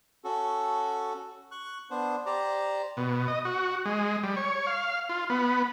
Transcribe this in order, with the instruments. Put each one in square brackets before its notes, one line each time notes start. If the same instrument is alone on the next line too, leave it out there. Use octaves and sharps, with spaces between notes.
[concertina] C#4 F#4 A4
C#6 F#6
B3 D4 C5
G4 C5 D5 A#5
[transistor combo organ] B2
D#5
F#4
G#3
G3
C#5
F5
F4
B3